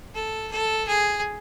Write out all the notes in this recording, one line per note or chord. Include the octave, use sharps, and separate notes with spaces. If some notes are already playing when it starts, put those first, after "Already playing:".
A4
A4
G#4